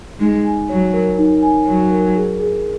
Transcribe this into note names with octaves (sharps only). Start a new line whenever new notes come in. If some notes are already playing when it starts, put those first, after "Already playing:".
G#3 D#4
G#5
F#3 C#5
A#4
D#4
G#5
F#3 C#5
A#4
G#4
G#4